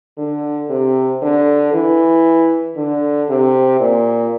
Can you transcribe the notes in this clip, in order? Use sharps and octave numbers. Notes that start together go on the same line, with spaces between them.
D3
C3
D3
E3
D3
C3
A#2